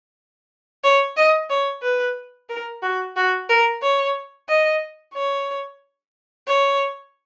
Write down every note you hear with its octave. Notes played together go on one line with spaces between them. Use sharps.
C#5
D#5
C#5
B4
A#4
F#4
F#4
A#4
C#5
D#5
C#5
C#5